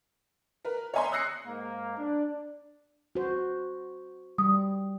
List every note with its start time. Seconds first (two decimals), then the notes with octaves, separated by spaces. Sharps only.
0.65 A#4 B4
0.94 C#5 D#5 E5 G#5 A#5 C6
1.12 D#6 E6 F#6 A#6 C7 C#7
1.46 G#2 A#3
1.98 D4
3.15 F#4 C5
4.38 G3 D#6